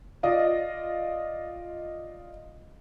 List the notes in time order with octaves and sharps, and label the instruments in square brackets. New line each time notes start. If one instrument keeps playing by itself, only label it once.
[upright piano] F4 D5 D#5